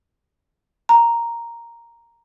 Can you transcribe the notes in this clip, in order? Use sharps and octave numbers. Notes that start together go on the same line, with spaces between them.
A#5